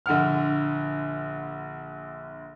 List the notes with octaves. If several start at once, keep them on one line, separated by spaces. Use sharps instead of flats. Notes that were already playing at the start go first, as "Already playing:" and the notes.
A#1 D3 F#5 F6